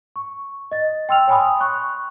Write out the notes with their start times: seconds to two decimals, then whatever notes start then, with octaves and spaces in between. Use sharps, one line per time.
0.16 C#6
0.72 D#5 A6
1.09 G5 C6 E6 F6 F7
1.27 C#5 G5 G#5 B5 C6 D#6
1.60 C#6 F#6